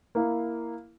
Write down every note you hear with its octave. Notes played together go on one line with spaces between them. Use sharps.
A#3 E4 F5